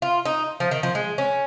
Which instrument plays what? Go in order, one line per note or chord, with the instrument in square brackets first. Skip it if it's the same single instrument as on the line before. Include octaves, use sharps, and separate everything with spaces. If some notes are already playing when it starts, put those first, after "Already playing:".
[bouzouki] F4
D#4
F3
D#3
F3
G#3
C#4